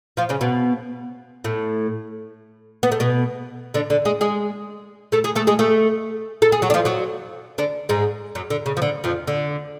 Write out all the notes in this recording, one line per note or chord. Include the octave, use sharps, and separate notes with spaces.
F3 F4
C#3 C#4
B2 B3
A2 A3
B3
A3
B2 B3
D3 D4
D3 D4
G#3 G#4
G#3 G#4
A3 A4
G#3 G#4
A3 A4
G#3 G#4
A3 A4
A4
G#4
F#3 F#4
D4
F3 F4
F#3 F#4
D3 D4
G#2 G#3
F#2 F#3
D3
C#3
F3
D3
F2 F3
D3